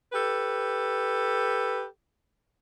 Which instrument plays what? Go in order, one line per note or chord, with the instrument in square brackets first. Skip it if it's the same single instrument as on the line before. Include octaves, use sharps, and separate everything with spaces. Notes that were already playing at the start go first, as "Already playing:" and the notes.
[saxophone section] G4 A4 B4